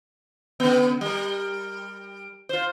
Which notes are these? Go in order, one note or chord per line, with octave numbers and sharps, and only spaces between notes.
C#3 B3
G3 A#4
F4 C5